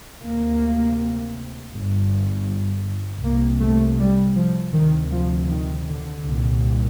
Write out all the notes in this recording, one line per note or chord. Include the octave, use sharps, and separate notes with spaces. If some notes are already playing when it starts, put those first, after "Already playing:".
D2 C3 A#3
G1 G2
C2 C3 A#3
A3
G3
F3
D2 C3 D#3
F3
D#3
D3
C2 A#2